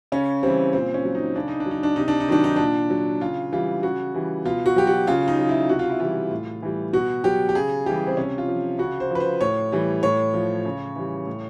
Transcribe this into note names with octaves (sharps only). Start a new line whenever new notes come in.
C#3 C#4
E3 G3 C4
A#2 C4
C#4
F#3
D#4
C#3 D4
D#4
D4
F#3
D#4
D4
C3 D#4
D4
D#4
D#3 F#3 D4
D#4
A#2 D4
F#3
C#3 F4
E3 G3 F4
C#3 F#4
E3 G3
B2 F4
F#4
F#3 G4
F#4
C#3 F4
D#4
F#3
E4
C3 F#4
F4
E4
E3 G3 F4
A2
E3 G3
B2 F#4
F#3 G4
G4
C#3 G#4
E3 G3 G4
C4
C3 C#4
F4
F3
C#3 F#4
C5
F3 B4
C5
A2 C#5
E3 G3
A2 C#5
F3
C#3
E3 G3
A2